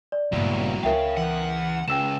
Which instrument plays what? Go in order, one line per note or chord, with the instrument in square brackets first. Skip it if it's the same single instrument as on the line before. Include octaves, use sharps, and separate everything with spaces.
[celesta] D5
[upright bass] G1 A#2 [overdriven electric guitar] C#2 [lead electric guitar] F#3 E4
[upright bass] C#2 [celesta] A#4 E5 G5 [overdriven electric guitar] C#5 F5
[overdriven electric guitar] E3 B3 [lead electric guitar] F#5
[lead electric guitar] C#2 [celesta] G5 E6 E7